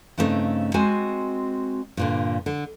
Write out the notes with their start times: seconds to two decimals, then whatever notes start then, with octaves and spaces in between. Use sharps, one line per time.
0.18 G2 C#3 A3 B3 C4 D#4
0.74 G#3 C4 F#4 G#5
1.97 G2 A#2 D3
2.46 D3